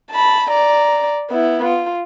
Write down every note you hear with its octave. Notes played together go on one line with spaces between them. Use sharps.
A5 B5
D5 A#5
B3 E4
F4